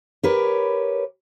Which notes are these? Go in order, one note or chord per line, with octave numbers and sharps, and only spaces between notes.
G4 A#4 B4 C#5